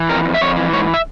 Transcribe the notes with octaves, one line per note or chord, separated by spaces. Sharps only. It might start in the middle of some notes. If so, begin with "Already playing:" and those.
Already playing: E3
F2 A#4
F2
E5
F2 C#5
E3
G#2 C#5
E5